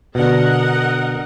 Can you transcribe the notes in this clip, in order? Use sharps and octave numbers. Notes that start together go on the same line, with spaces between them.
B2 D3 A#4 D#5 F#5